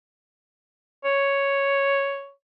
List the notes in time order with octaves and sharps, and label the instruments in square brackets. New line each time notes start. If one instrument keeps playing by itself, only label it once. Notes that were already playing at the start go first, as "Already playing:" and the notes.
[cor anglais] C#5